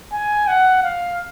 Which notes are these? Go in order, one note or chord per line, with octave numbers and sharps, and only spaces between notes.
G#5
F#5
F5